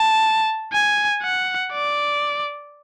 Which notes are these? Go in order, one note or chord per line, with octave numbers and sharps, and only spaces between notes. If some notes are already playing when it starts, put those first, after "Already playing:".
Already playing: A5
G#5
F#5
D5